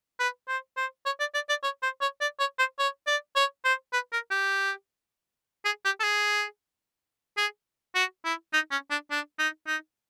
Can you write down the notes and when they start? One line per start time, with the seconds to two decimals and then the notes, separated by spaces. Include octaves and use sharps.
0.19 B4
0.48 C5
0.77 C5
1.06 C#5
1.20 D5
1.35 D5
1.49 D5
1.64 C#5
1.83 C5
2.01 C#5
2.21 D5
2.40 C#5
2.59 C5
2.79 C#5
3.07 D5
3.36 C#5
3.65 C5
3.93 B4
4.13 A#4
4.31 G4
5.65 G#4
5.85 G4
6.00 A4
6.04 G#4
7.37 G#4
7.95 F#4
8.25 E4
8.53 D#4
8.71 C#4
8.91 D4
9.11 D4
9.39 D#4
9.68 D#4